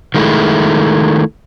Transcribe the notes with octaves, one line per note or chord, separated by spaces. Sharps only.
D#3 G#3 A3 E4